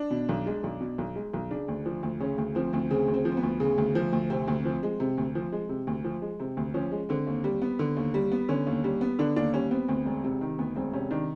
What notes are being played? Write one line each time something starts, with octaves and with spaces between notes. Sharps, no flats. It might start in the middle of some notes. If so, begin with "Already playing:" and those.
Already playing: D4
B2
B1
G#3
B1
B2
B1
G#3
B1
C#3 D4
D2
F3
D2
C#3 C#4
D2
F3 C4
D2 C4
C#3 C4
D2
C4
F3
C4
B3
D2
C#3
D2
F3
D2
C3 C4
D2
F3
G#3
C3
D2
F3
G#3
C3
D2
F3
G#3
C3 C4
D2
F3 C#4
G#3
D3 C4
D#2
G3
B3
D3
D#2
G3
B3
D3 C#4
D#2
G3
B3
D3 D4
D#2 D4
G3 C#4
B3 C4
D2 C4
E1
C3
D#3
D2 B3
E1 C4
C3 C#4
D#3 D4